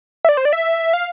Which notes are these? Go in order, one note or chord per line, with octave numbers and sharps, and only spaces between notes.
E5
D5
C5
D5
E5
F5